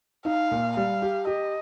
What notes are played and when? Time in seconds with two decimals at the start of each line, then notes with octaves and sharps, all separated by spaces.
0.25 D#4 F5
0.52 A#2
0.77 G3 F5
1.02 G4
1.27 G4 D#5